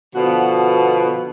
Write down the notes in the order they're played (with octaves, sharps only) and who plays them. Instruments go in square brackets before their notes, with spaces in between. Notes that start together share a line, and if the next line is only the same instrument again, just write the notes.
[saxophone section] B2 D3 F3 B3 F#4